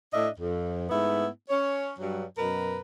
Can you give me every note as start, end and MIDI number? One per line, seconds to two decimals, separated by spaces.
0.13 0.28 45
0.13 0.28 62
0.13 0.28 75
0.13 0.28 76
0.38 0.87 41
0.90 1.26 44
0.90 1.26 57
0.90 1.26 59
0.90 1.26 64
1.49 1.93 61
1.49 1.93 73
1.99 2.24 43
1.99 2.24 54
2.37 2.80 42
2.37 2.80 47
2.37 2.80 70
2.37 2.80 71